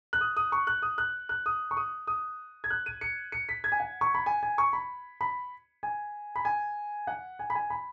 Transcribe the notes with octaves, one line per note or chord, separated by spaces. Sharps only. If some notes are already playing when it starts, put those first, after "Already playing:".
F#6
D#6
D#6
C#6
F#6
D#6
F#6
F#6
D#6
C#6
D#6
D#6
G#6
F#6
D#7
C#7
C#7
B6
G#6
G#5
F#5
C#6
B5
G#5
G#5
C#6
B5
B5
G#5
B5
G#5
F#5
G#5
B5
G#5
B5